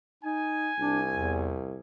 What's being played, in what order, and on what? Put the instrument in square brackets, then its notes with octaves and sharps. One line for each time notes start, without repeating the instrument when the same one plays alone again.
[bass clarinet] D#4 [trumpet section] G#5
[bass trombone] C2 [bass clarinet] D4
[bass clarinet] E2